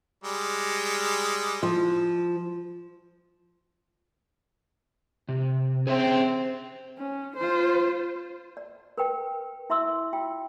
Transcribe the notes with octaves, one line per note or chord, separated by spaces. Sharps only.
G3 G#3
F3
C3
C4 G#4 C5 E5
C#4
F4 C5
D5
A#4 B4 G5
E4 E5 C6 E6
F4 G5